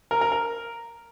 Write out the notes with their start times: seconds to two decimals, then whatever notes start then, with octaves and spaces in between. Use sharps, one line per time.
0.11 A#4
0.21 A#4
0.32 A#4